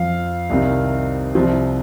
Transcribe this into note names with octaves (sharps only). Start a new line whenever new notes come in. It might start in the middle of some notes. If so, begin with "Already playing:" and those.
Already playing: F2 F3 F5
C2 C3 D#3
C2 C3 F3